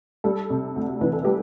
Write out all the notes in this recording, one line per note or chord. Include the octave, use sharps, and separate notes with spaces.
G3 A4
C3
D2
E3 B4
A4
G3 G4